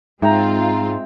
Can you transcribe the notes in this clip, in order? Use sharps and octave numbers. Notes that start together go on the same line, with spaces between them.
G#2 G#3 C4 F4 E5 G5 A#5